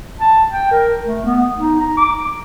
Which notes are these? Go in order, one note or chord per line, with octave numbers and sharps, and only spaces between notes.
A5
G5
A#4
A3
B3
D#4
A#5
D6